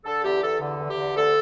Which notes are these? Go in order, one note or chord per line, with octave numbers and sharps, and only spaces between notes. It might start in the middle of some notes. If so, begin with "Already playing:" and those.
D3 A4
E2 G4
E2 A4
D3
E2
G4
D3
D2 A4